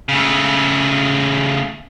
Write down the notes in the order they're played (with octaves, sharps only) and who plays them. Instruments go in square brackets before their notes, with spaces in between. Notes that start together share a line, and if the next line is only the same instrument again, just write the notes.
[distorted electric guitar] C#3 A3